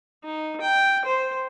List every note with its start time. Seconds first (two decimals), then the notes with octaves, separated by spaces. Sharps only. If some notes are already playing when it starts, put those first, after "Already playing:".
0.24 D#4
0.61 G5
1.05 C5